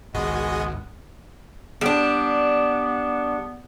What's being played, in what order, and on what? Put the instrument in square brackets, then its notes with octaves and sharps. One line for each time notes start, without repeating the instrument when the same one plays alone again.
[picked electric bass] G#1 [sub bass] C#2 [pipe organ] G#3 B3 [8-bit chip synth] F#4 G#4 D#5
[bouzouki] G3 D4 [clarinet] B3